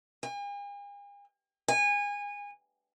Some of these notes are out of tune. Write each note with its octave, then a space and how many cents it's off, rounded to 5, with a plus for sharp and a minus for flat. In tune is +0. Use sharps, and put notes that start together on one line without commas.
G#5 -45
G#5 -25